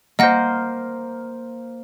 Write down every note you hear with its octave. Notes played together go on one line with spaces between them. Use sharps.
A#3 C5 D#5 F#5 A#6